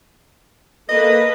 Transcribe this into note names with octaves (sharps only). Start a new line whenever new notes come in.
A#3 A4 B4 D#5